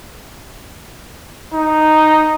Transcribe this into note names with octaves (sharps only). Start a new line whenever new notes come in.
D#4